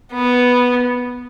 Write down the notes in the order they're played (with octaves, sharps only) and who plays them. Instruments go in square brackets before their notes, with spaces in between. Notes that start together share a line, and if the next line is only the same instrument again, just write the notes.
[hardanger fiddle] B3